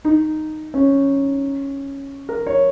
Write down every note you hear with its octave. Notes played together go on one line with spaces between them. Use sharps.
D#4
C#4
A#4
C#5